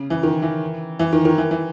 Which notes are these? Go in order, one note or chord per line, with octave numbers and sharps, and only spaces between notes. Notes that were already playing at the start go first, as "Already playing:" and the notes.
Already playing: C#3
E3
D#3
E3
E3
D#3
D#3
E3
E3